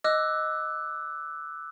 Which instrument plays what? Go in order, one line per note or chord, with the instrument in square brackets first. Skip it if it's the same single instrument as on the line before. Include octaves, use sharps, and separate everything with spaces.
[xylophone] D#5 [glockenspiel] D6 E6 F#6